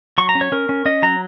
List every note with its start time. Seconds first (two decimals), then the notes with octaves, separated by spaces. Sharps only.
0.18 F#3 C#6
0.29 A#5
0.35 C#4
0.41 C#5
0.52 C#4 A#4
0.69 C#4
0.85 C#4 D#5
1.02 F#3 A#5